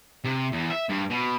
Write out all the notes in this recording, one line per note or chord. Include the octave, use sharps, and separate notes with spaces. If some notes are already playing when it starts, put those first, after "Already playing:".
C3
E2
E5
G2
B2